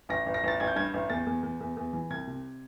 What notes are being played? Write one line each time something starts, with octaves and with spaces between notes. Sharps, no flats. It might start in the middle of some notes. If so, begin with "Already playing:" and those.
A1 A#6
A1
A#6
A1 A6
A1 G#6
G6
G2 G#6
A1
E2 A6
E2
E2
E2
E2
E3
C2 G#6
C3